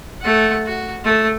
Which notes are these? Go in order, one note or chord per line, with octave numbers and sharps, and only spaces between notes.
A3 F#5
F#4
A3